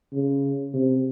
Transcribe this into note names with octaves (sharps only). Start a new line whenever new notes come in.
C#3
C3